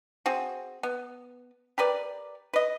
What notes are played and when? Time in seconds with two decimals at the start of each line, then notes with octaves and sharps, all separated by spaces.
0.26 C4 F#4 G#4
0.83 B3
1.78 G4 A#4 B4 D5
2.53 B4 D#5